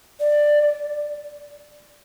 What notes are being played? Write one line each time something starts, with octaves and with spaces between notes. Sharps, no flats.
D5